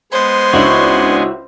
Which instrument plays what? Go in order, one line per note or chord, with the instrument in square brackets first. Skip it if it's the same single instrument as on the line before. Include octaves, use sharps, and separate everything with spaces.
[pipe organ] G#3 B3 G#5 [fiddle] C5
[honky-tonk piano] C#2 D4 [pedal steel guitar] E4 F#4 C#5